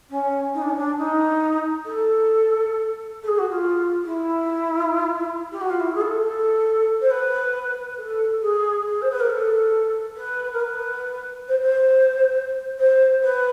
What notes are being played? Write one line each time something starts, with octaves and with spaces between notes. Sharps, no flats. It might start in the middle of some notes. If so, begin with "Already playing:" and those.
C#4
D#4
D4
C#4
D4
D#4
A4
A4
G#4
F#4
F4
E4
G4
F#4
F4
E4
G#4
A4
A4
C5
B4
A4
G#4
G#4
C5
B4
A#4
A4
B4
A#4
B4
C5
C5
C5
B4